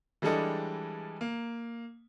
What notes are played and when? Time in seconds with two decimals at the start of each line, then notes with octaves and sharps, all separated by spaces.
0.22 E3 G3 G#3 D4 A4 D#5
1.21 A#3